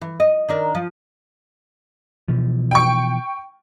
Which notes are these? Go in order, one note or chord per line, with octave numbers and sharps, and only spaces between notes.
E3
D#5
D#3 D4 A#4
F3
B2 E3 F3
G5 C#6